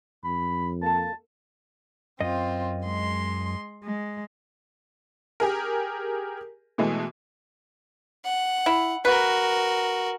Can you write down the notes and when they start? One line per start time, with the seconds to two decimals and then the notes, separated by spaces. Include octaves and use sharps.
0.24 F2 B5
0.82 A#3 A4 A5
2.21 F#2 C4 F4 D#5
2.83 G#3 C6
3.84 G#3
5.40 G4 G#4 A#4
6.78 B2 E3 G#3 A3
8.25 F#5
8.66 E4
9.05 F#4 A#4 B4